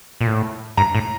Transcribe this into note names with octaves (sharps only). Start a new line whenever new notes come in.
A#2
A2
G2 A#5
A2